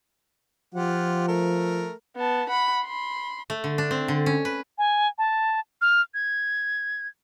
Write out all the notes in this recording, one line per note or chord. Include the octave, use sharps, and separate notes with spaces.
F3 F4 G4 F#5
A3 A#4
B3 A5
F#5 B5
B5 C6
A3
D3
D4
C4
D3
C#4
B4
G#5
A5
F6
G#6